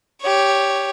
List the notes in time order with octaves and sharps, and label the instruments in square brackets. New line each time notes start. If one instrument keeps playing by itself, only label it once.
[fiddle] G4 C#5